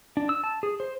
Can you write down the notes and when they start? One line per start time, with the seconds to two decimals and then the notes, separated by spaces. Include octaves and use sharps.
0.17 D4
0.29 E6
0.44 A5
0.63 G#4
0.80 C5